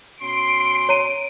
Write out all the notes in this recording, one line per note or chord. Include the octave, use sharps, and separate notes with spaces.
B2 C#4 C6 C7 D7
C#5 A#5 D7 D#7